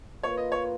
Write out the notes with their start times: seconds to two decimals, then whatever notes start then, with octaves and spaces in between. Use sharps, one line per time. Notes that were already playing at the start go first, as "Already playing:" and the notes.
0.23 A#3 F4 B4 C#5
0.37 D#5
0.52 C#5